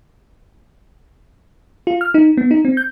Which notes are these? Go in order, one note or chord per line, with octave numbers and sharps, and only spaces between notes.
F4
F6
D#4
B3
D#4
C4
G6